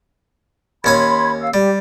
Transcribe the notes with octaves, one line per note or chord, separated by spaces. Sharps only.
D#2 C#4 G#5 B5 C6 G#6
F5 E6
G3 G4 D5